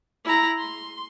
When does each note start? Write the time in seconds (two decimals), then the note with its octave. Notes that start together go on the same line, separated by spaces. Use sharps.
0.25 E4 A#5
0.58 C6